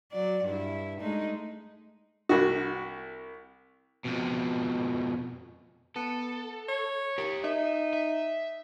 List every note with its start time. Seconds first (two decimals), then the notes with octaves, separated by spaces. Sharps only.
0.13 F#3 D5
0.44 G2 E4
1.00 G#3 A3 D#4
2.29 C2 F#4
4.05 F2 B2
5.96 B3 A4
6.69 C#5
7.18 G4 A#4
7.44 D#4 E5
7.93 E5